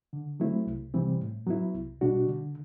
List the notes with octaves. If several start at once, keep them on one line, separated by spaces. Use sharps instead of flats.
D3
F#3 A3 C4 E4
C2
C3 E3 G3 C4
A2
F#3 B3 E4
C2
B2 G3 D4 F#4
D3